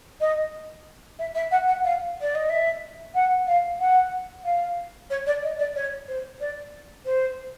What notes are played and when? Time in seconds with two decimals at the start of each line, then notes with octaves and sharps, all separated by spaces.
0.20 D#5
1.19 E5
1.34 E5
1.51 F#5
1.67 F#5
1.84 F5
2.21 D5
2.35 D#5
2.49 E5
3.14 F#5
3.47 F5
3.79 F#5
4.44 F5
5.10 C#5
5.26 D5
5.43 D#5
5.59 D5
5.75 C#5
6.08 C5
6.40 D5
7.05 C5